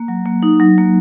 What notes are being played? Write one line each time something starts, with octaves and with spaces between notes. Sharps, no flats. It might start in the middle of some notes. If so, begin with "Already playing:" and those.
Already playing: A#3
F#3
A#3
D#4
F#3
A#3